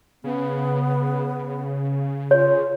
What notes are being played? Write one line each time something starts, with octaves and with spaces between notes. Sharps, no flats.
C#3 B3
F4 C#5